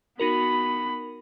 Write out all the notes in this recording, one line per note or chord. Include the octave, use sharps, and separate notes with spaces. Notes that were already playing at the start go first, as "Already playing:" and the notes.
B3 D#4 F#4 A#4 B5